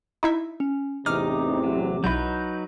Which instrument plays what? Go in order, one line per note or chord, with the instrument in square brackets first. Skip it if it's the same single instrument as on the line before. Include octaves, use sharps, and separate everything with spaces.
[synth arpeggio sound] D#4 E4 E5
[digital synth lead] C#4
[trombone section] A1 E2 C3 [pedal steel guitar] D#4 [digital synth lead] D6 [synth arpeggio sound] F6
[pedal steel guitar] F#3
[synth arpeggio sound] B1 E4 [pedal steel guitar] F#3 D#4 B4 [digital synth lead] G6